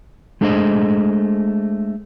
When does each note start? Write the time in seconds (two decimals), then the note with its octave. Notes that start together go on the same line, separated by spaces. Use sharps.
0.41 G#3 A3 D4 G#4 C5 D#5